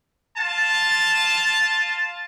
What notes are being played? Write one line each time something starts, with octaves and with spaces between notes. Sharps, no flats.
F4 A5